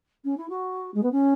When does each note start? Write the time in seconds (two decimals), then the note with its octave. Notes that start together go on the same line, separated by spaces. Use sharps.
0.24 C#4
0.37 E4
0.49 F#4
0.94 G#3
1.03 B3
1.12 C#4